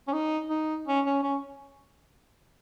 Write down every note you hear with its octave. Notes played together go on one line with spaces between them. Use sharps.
C#4
D#4
D#4
C#4
C#4
C#4